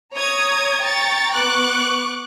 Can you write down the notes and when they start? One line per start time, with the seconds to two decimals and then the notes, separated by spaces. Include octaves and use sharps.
0.14 C#5 A#5 D#6 G#6
0.81 G5 A#5 C#6 A6
1.33 B3 C#6 D6 F#6